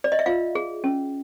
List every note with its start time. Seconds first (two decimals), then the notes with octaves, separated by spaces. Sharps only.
0.04 D5
0.12 D#5
0.19 E5
0.26 F4 F5
0.55 G#4
0.84 C#4